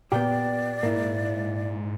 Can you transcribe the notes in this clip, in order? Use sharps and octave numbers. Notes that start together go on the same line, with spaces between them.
A#2 B3 G4 D5 G5
G#2 A#3 E4